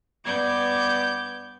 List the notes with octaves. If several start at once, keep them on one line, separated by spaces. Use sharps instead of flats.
G2 B3 D5 D6 G6 G#6